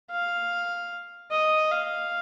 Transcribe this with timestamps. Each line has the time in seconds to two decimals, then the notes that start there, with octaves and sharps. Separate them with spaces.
0.11 F5
1.31 D#5
1.71 F5